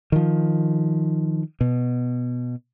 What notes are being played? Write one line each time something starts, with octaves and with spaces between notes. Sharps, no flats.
D#3 F3
B2